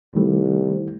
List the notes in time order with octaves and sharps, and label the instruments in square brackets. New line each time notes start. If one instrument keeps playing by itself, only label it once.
[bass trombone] C2 [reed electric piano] D#3 G3 A3